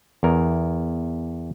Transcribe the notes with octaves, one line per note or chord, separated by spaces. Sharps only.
E2 A#4